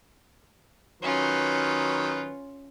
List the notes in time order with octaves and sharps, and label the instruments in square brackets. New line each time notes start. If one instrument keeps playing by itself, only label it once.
[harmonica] D#3 F#3 B4 [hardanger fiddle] C#4 F4